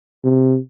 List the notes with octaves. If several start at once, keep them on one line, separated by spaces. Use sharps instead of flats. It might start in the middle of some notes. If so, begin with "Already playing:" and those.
C3